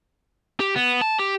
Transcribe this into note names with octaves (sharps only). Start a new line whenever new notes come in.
G4
B3
A5
G4